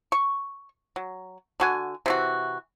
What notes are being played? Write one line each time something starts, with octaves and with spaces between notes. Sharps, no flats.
C#6
F#3
D3 F#4 G#5
C3 E3 F#4